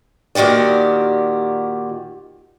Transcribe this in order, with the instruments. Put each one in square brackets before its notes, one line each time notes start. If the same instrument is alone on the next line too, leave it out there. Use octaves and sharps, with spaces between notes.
[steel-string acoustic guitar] A#2 D#3 F#4 G4 D5